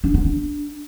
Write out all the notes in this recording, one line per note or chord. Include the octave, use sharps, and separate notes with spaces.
D4
B3
D4